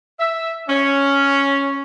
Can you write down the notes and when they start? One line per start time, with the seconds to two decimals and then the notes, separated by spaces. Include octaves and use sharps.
0.20 E5
0.69 C#4